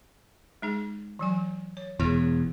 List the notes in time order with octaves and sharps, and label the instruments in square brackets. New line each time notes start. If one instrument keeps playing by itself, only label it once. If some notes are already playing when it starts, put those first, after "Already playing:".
[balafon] G#3 D#4 G#4
E3 F#3 G#5
C#5
[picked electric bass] E1 E2 [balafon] E3 G#4